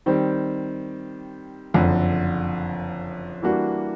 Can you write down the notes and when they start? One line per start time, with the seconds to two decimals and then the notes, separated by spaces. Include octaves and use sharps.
0.06 D#3 G3 C4
1.74 F#1 F2 D3
3.42 E3 G3 A#3 D4 F#4